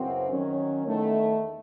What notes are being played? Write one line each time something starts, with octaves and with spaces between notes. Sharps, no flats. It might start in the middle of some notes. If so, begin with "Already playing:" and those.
Already playing: F#2 C#3 E3 C4 F#4
D#3 F#3 C#4
E2 D#3 A3